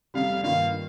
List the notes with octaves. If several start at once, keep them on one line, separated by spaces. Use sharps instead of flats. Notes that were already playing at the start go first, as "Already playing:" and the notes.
F1 F2 C3 G3 F5
G2 D#3 A#3 F4 F5